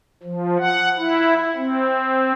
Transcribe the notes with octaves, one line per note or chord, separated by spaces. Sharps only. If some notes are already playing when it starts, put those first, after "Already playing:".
F3
F#5
E4
C4